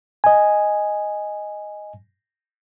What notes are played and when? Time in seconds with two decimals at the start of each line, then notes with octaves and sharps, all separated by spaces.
0.24 D#5 G#5